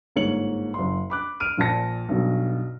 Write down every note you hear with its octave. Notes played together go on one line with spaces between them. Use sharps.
G1 G#2 A#3 C#5 C#7 F#7
F#1 C6
B5 D6 F#6
F6 D7 D#7
A#1 A#2 A5 A#6 C#7
B1 G2 B2